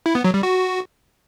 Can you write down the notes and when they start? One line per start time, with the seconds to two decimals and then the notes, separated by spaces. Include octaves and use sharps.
0.06 E4
0.15 B3
0.24 F#3
0.34 G3
0.43 F#4